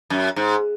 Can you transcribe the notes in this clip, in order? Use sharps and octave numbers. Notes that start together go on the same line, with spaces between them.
F#2
G#2